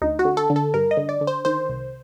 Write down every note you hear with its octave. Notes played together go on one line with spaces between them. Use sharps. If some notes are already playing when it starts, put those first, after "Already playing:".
D2 D#4
F#4
D3
A4
D3
A4
G2 A#4
D#5
D3
D5
D3
C5
D#3 C5
C2